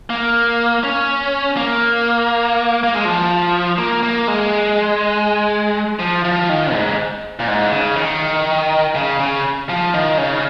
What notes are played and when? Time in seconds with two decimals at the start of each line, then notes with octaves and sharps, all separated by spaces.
0.10 A#3
0.83 C#4
1.57 A#3
2.83 A#3
2.94 G#3
3.05 F3
3.78 A#3
4.03 A#3
4.28 G#3
5.99 F3
6.24 F3
6.49 D#3
6.74 G#2
7.39 A#2
7.48 G#2
7.72 C#3
7.96 D#3
8.95 C#3
9.20 C#3
9.69 F3
9.94 D#3
10.18 C#3